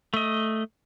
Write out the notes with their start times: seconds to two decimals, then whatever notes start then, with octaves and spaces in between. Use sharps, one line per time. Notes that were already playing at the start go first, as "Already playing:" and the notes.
0.14 A3 D#5